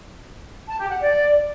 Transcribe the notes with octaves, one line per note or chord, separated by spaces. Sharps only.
A5
G4
F#5
D5